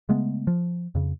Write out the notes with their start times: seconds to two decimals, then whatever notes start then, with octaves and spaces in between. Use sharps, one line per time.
0.09 C#3 G#3 A3 B3
0.47 F3
0.95 F2 C#3